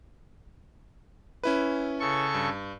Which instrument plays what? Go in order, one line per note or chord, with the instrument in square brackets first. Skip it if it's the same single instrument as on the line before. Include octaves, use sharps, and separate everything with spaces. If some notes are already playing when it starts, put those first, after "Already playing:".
[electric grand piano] C#4 E4 B4
[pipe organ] C#3 A4 C#6
[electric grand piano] G2